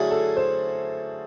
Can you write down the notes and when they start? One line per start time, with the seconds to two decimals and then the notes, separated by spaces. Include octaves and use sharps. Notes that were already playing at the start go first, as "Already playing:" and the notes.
Already playing: D3 F#3 A3 C#4 E4 F#4 G#4
0.11 A4
0.36 C5